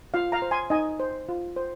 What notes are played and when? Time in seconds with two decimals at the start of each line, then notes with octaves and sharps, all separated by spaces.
0.14 F4 F5
0.32 F5 A#5
0.42 C5
0.51 G#5 C6
0.70 D#4 D#5 G#5
1.00 C5
1.29 F4
1.56 C5